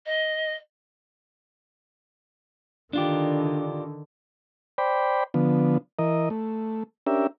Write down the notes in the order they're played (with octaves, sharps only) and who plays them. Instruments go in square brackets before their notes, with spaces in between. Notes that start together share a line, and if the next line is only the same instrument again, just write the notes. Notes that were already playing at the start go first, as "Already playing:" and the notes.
[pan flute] D#5
[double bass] D3 D#3 [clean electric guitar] D4 F4 G4
[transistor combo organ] C5 D5 G5 B5
D3 F3 B3
E3 A#4 D#5
A3
C#4 D4 G4 A#4 E5